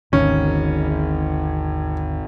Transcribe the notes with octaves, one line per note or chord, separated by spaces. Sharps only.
G#1 D#2 G#2 D3 D#3 C#4